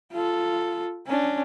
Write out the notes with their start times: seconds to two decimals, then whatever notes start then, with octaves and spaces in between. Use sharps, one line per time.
0.12 F4 A4
1.07 C#4 D4